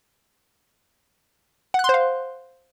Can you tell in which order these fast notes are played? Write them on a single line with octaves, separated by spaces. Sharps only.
F#5 F#6 C6 C5 F5